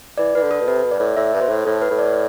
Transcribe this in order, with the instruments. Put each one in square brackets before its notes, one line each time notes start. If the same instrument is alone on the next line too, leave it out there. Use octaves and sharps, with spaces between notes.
[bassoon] E3 [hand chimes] D5
[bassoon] E3 [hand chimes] B4
[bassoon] D3
[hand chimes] A4
[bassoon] B2
[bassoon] C3 [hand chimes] B4
[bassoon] B2
[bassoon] G2 [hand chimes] D5
[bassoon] A2
[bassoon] A2 [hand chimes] E5
[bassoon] G2
[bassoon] B2 [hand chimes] C5
[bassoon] A2
[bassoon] A2 [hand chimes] A4
[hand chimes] B4
[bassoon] A2
[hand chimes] D5